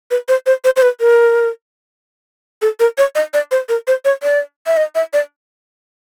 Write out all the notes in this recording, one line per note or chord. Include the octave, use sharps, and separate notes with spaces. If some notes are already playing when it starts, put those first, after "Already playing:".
B4
C5
C5
C5
C5
B4
A#4
A4
A#4
C#5
D#5
D5
C5
A#4
C5
C#5
D5
E5
D#5
E5
D5